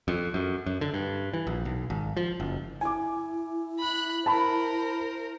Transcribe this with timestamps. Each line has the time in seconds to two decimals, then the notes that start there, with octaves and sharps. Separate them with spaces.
0.08 F2
0.34 F#2
0.66 F#2
0.81 D3
0.94 G2
1.34 E3
1.47 A#1
1.65 B1
1.90 G#1
2.17 F3
2.40 F#1
2.81 E4 G#5 D6
3.79 B5 F#6
4.26 A#4 C5 A5 B5